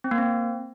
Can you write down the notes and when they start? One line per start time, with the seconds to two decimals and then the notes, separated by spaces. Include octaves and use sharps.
0.04 C4
0.11 A#3
0.18 C4